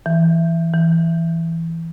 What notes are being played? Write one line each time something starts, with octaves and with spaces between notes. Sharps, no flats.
E3
E3